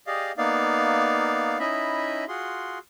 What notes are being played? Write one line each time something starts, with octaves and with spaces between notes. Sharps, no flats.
G4 G#4 D5 D#5 F5
A#3 B3 D#4 D5 F5
C#4 D#4 E4 D#5 E5 B5
F4 F#4 G#4 C6